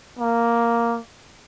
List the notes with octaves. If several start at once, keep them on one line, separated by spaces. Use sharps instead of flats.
A#3